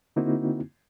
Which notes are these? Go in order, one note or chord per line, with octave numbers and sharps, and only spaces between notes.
D3 A#3 C4 D#4 E4 F#4